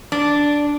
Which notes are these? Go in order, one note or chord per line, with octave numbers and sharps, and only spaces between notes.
D4